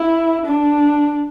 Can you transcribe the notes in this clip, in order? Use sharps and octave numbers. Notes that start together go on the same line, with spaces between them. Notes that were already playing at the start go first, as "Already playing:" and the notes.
Already playing: E4
D4